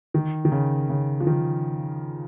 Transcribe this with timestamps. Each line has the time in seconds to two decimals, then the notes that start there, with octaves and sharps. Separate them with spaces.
0.14 D#3
0.45 D#3
0.52 C#3
0.89 C#3
1.20 F3
1.27 D#3